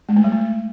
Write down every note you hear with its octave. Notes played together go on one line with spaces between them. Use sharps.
G#3
A3
G3
A3